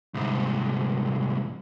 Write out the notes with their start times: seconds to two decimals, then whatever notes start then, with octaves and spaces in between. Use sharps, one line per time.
0.14 C2 G#2